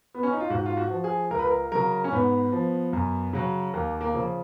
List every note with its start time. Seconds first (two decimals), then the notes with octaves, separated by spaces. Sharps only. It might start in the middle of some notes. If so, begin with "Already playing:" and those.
0.14 B3
0.23 C#4
0.32 D#4
0.40 F4
0.50 G#2 F#4
0.66 F4
0.77 F#4
0.90 F3
1.04 G#4
1.30 C#2 A#4
1.39 B4
1.47 A#4
1.72 C#3 F#3 A#4
2.04 C#4
2.12 G#2 B3
2.52 F3
2.93 F#2
3.33 C#3 F#3
3.73 D#2 A#3
4.01 A#3
4.14 C#3 F3